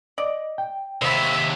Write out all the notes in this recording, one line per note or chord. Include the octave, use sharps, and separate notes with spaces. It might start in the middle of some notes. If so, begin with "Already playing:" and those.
D5 D#5
G5
D#2 C3 C5 E5 B5